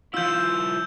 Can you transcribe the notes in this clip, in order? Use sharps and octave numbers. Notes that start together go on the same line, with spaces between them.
F3 E4 F4 E6 G6